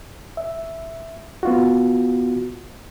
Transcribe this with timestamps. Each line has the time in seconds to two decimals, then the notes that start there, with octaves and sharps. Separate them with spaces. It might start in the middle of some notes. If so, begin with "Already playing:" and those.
0.37 E5
1.43 B3 F4 F#4